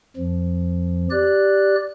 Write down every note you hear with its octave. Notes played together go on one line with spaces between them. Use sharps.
F2 F3
G4 D5 F#6